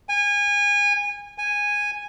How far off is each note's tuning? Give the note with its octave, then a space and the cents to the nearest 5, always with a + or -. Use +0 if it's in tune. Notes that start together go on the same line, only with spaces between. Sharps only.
G#5 -25
G#5 -10